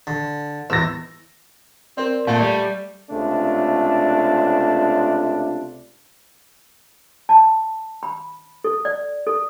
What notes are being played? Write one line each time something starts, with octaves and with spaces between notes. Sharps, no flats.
D3
E2 E6 A#6
C4 A#4 D5
A#2 A3 F5 G#5 G6
G3 D5
C#2 C3 A3 D4 F4
A5
B5
A4
D5
A4